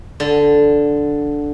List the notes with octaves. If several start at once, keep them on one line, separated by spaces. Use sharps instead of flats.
D3